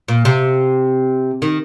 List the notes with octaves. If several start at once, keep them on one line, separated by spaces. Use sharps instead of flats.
A#2
C3
D#3